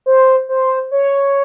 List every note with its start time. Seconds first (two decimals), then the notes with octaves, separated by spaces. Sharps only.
0.06 C5
0.49 C5
0.91 C#5